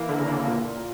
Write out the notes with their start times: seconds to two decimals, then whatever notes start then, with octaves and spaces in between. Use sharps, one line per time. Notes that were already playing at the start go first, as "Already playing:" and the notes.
Already playing: E3 A#3
0.09 D3
0.19 C#3
0.28 D3
0.38 C#3
0.47 A#2